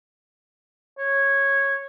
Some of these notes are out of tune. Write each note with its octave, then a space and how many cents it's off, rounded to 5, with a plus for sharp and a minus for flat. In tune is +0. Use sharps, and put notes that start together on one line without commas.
C#5 -10